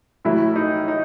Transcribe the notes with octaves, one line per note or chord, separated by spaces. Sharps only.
A1 A2 F#3 A3 E4
D#4
D#4